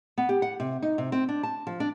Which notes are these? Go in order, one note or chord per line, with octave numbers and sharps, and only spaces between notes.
B3
G4
F#5
C3
D#4
C3
C4
D4
A5
F3
D4